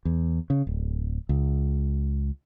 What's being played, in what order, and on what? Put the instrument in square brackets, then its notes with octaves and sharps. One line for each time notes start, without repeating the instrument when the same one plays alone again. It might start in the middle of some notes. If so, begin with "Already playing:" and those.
[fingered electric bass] E2
C#3
D1
C#2